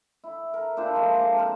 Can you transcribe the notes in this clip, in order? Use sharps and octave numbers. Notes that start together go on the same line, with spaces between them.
E4
A#4
A#2 D4 E4 C5
F3 G#3
A#3 A5
C4 A#4 C5